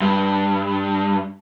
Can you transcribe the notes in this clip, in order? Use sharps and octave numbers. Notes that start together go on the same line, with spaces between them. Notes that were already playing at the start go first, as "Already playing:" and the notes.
G2